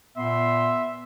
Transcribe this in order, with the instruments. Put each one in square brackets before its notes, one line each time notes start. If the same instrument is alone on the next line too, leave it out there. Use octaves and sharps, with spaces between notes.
[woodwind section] A#2 C6 [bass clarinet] B3 [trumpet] E5